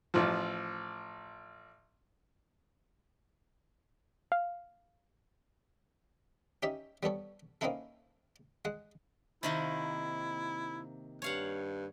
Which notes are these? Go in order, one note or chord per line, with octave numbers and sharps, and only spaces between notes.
A1 F3
F5
C#4 D#4 G4 E5
G3 B3 A4 C#5
A#3 C4 C#4 D#4 E4 A4
G#3 F#5
C3 D#3 A#3 E4
G2 C#5 F5 F#5